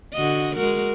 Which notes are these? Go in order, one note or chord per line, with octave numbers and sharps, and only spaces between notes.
D3 F#4 D#5
G#3 F#4 A#4